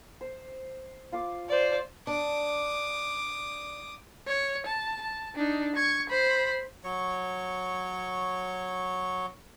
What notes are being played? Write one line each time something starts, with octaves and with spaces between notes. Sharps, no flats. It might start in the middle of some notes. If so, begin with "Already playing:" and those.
C5
F4 F5 D6
C5 D5
D4 D6 D#6
C#5
A5
A5
D4 D#4
C#6 G#6
C5 B5
F#3 C#5 C#6